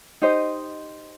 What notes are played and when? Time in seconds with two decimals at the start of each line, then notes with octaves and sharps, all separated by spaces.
0.22 D#4 G4 C5 D#5